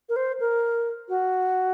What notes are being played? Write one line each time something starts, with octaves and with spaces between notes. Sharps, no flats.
A#4
C5
A#4
F#4